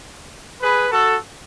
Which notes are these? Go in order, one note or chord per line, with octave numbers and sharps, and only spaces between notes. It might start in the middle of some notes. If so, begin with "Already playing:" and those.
G#4 B4
F#4 A4